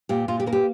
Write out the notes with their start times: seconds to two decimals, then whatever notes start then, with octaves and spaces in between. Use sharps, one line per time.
0.09 A#2 G4
0.28 A#2 F4
0.40 G4
0.46 A#3 A#4
0.53 G4